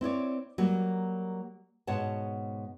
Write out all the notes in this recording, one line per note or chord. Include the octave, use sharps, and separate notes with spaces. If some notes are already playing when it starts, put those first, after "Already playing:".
C4 E4 C#5 D5
F#3 G3 A#3
G#2 B2 C#5 F#5 A5